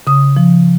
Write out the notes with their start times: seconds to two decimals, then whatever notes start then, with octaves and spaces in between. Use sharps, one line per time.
0.07 C#3 D#6
0.37 F3